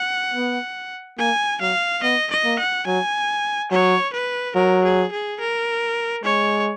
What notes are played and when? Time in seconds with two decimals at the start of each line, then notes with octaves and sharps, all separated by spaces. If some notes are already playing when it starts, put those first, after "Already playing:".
Already playing: F#5
0.34 B3
1.18 A#3 G#5
1.61 F#3 F5
2.03 B3 D#5
2.31 D#5
2.44 A#3
2.59 F#5
2.86 F#3 G#5
3.71 F#3 C#5
4.13 B4
4.55 F#3 A#4
4.84 G#4
5.12 G#4
5.40 A#4
6.24 G#3 C#5